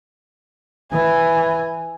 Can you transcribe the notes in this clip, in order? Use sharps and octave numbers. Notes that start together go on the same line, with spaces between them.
E3 G#5